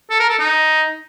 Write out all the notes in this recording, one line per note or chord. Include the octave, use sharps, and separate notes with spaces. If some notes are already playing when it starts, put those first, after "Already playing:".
A4
A#4
A4
D#4